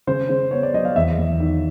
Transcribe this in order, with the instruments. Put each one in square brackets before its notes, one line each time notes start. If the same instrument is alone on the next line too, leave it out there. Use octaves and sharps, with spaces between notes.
[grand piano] C#3 C5
C#3
B3 C#5
D5
F#3 D#5
F5
E2 E5
E2
D#3